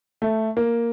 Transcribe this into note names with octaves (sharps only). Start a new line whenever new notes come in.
A3
A#3